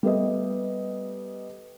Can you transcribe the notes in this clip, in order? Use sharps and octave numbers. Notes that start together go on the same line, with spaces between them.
G3 A3 B3 D#5